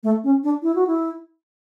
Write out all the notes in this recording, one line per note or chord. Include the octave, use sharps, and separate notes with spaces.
A3
C#4
D4
E4
F#4
E4